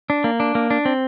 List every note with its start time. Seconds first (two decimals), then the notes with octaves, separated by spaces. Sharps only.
0.10 D4
0.24 A#3
0.40 D4
0.55 A#3
0.70 D4
0.85 C4